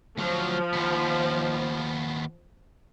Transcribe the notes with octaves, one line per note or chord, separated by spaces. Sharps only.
D2 F3 F#3
D#2 B3